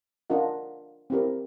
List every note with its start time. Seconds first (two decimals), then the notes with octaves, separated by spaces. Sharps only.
0.30 D4 F4 A#4 D#5 F#5
1.10 C4 E4 G4 A#4